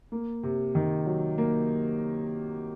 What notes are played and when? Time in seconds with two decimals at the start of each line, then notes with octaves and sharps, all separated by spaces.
0.12 A#3
0.43 C3
0.75 D#3
1.06 F#3
1.38 A#3